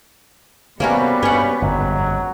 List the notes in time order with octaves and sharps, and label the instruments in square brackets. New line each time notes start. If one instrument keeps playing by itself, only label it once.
[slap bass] C3 [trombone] G3 [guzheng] A#3 C#4 F#4 [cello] B3 B4
[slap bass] G2 [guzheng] C#4 F#5
[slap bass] G1 F2 G#2 [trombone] F#3